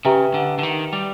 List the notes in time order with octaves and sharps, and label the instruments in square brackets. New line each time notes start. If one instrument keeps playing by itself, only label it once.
[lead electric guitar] C#3 [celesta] G4 B4 E5 G5 A#5
[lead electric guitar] D3
D3
D#3
G3